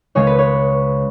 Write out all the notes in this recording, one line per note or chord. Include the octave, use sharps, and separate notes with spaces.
C#2 C#3 G#3 C#4 C#5
B4
C#5